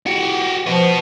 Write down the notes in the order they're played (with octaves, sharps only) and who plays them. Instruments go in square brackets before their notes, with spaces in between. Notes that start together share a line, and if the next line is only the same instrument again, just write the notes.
[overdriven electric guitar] F#4 G4
[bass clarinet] F3 [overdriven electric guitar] B3 F#4